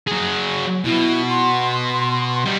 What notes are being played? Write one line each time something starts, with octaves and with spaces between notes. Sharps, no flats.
F#3 G#4
B2 E4
C6
G3 D#4